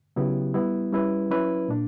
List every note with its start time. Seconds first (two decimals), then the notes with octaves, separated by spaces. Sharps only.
0.16 C#3 F#3 B3 E4 G4
0.54 G3 B3 E4
0.92 G3 C#4 E4 B4
1.30 F#3 C#4 E4 B4
1.69 A#2 A#3 D4